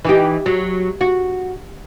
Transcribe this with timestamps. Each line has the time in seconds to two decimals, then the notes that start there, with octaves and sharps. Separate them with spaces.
0.05 E3 D#4 G4
0.46 F#3
1.01 F#4